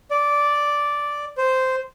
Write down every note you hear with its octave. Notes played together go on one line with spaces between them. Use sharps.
D5
C5